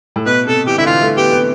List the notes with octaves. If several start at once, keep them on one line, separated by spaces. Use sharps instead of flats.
A2
B2 B4
C3 A4
E3 G4
D3 E4
E3 F4
A3
B3 G4
B3